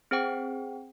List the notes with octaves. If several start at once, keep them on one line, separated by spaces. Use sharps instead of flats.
C4 G#4 C5 F#5 G5